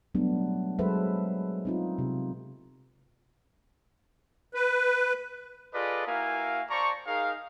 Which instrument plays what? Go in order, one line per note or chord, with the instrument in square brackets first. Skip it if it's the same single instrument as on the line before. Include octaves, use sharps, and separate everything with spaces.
[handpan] F#3 G3 A3 B3 D4
F#3 G#3 A4 B4 C5 E5
C4 D#4 F4
C3
[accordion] B4
[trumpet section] F4 G#4 A4 B4 D5 D#5
A#3 E4 F#4 A#4 F5 G#5
C5 D5 A5 A#5 C#6
D#4 G#4 A#4 F5